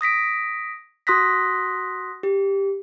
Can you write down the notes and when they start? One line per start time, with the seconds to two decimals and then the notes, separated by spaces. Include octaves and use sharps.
0.01 D#6 A#6 B6 D7
1.07 F#4 C6 D#6 F#6 A#6 B6
2.23 G4